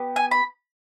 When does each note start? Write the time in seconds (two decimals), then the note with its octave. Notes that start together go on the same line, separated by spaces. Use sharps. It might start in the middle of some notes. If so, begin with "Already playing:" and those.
Already playing: B3 G4
0.16 G#5
0.31 B5